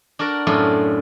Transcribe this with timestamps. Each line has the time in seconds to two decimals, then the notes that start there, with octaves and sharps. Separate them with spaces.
0.19 D4 F#4 A#4 D5
0.47 F#2 A2 A3 B3 D4 F4